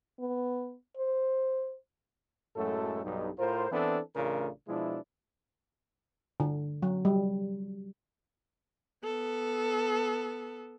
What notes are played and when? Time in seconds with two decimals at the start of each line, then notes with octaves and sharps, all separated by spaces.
0.20 B3
0.97 C5
2.56 F#2 A2 F#3 G#3 A3 A4
3.04 B1 G2 D#4
3.38 A2 F4 A#4 C5
3.72 E3 B3 C4 D4 E4 A4
4.15 A1 C#3 A3 D4 F4 A#4
4.68 B2 F3 G#3 D4 E4
6.40 D3
6.83 F#3
7.05 G3
9.04 B3 A4